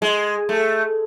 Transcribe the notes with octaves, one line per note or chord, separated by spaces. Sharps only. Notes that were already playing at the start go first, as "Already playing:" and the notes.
G#3
A3